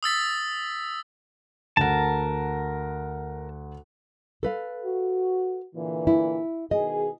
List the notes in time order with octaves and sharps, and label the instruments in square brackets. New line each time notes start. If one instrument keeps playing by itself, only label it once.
[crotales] D#6 E6 A6 B6
[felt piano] D2 F#5 [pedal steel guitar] A#4 A5
[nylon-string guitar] A4 B4 F5
[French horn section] F#4
A#2 D3 E3
[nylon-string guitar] E4
[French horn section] B2 D#3 G#4 [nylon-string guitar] D#5